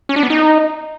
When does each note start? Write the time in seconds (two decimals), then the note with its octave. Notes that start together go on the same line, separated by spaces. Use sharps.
0.09 C#4
0.16 D4
0.23 B3
0.30 D#4